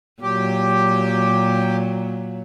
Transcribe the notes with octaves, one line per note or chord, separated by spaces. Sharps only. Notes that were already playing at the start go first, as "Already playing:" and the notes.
A#2 F#3 G4